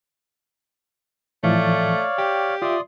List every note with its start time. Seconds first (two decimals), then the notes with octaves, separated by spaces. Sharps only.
1.43 A2 E3 F3 A3 C#5 D5 F5
2.18 G4 G5
2.62 F4 D5 E5 C6 D#6